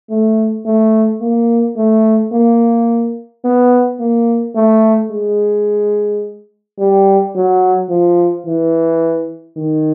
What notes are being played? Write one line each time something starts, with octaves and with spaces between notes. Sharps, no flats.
A3
A3
A#3
A3
A#3
B3
A#3
A3
G#3
G3
F#3
F3
E3
D#3